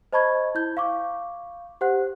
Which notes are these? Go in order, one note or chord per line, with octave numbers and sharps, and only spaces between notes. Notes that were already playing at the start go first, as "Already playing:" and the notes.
C5 D#5 A5 B5 C#6 G#6
E4 G6
F5 C#6 D6
G4 C5 F#5 F#6